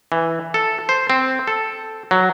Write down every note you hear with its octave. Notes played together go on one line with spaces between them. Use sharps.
E3
A4
C5
C4
A4
F#3